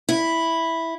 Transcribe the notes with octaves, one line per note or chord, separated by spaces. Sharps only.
E4